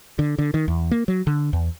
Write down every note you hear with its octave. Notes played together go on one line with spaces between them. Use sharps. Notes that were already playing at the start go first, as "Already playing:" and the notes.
D3
D3
D#3
E2
A#3
F#3
D3
E2